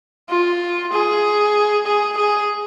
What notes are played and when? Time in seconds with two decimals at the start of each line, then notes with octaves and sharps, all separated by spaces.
0.29 F4
0.92 G#4
1.86 G#4
2.17 G#4